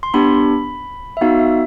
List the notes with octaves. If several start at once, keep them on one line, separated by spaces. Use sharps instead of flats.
C6
B3 D4 G4 B5
E5
B3 D#4 F#4 F5
E5